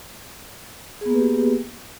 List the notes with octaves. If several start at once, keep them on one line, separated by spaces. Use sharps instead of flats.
A#3 B3 G4 G#4 B4